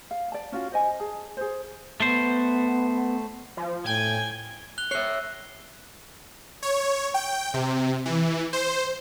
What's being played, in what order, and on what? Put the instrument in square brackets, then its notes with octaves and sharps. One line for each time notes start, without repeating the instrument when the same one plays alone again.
[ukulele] F5 F#5
D5 A5
C#4 F4 F#4
C5 D#5 G#5
G#4 A5
G#4 C5
[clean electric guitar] A3 C5 [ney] B3
[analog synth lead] F3
[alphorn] A2 [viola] G5 [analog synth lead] G#5 [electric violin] G#6
[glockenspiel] F#6 F7 G7
[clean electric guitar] C#5 E5 [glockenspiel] F#6 C7
[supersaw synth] C#5
G5
C3
E3
C5